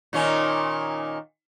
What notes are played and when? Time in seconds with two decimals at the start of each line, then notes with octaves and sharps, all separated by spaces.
0.13 A#2 D#3 C#4